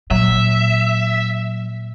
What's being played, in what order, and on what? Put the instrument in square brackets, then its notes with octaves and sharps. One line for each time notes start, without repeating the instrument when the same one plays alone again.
[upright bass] A#2 [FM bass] F#3 [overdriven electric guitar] E5